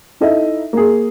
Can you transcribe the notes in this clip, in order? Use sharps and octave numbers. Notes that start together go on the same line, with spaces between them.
D#4 E4 A4 D#5 E5
A#3 G#4